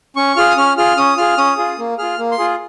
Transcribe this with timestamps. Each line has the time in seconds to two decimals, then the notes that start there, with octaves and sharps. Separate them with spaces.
0.16 C#4 C#6
0.36 F4 G#4 F6
0.50 D#6
0.57 C#4 F6
0.77 F4 G#4 F6
0.97 C#4 D#6
1.18 F4 G#4 F6
1.38 C#4 D#6
1.58 F4 G#4
1.78 A#3
1.99 F4 G#4 F6
2.19 A#3
2.32 C6
2.39 F4 G#4